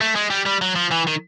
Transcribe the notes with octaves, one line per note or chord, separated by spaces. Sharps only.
A3
G#3
G3
G3
F#3
F3
E3
D#3